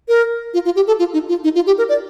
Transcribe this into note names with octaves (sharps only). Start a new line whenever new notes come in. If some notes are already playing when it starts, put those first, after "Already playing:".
A#4
F4
F4
G4
A4
F4
D#4
F4
D#4
F4
G4
A#4
D5